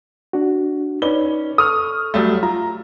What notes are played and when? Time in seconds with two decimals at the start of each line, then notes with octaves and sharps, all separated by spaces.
0.33 D4 F#4
1.02 C#4 D#4 B4 D5 G7
1.58 A4 C#6 D#6 F6
2.14 F#3 G3 A3
2.43 F4 A#5